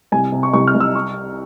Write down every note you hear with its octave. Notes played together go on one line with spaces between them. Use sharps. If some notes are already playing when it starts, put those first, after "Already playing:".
C2 G#5
C3
C#6
C2 C#6
F6
C2
E6
C#6